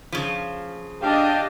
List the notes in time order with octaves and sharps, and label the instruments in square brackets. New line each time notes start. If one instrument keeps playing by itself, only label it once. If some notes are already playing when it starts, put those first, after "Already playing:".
[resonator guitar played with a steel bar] C#3 F3
[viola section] D4 D#5 [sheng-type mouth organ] G4 F5 G5